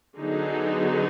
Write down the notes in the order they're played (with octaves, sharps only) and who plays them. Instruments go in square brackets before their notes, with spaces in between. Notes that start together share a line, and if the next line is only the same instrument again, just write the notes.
[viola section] D3 F#3 B3 D#4 G#4